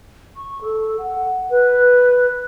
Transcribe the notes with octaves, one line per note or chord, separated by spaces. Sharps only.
C#6
A4
F#5
B4